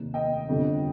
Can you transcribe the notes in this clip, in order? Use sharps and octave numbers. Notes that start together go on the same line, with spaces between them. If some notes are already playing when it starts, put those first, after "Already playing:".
Already playing: F1 D#2 D#3
D#5 G5
G1 F2 D3 G3